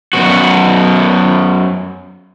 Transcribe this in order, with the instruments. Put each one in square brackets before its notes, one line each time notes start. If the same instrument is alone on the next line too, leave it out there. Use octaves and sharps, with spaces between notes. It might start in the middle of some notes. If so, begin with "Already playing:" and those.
[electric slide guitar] F#2 B3 F#4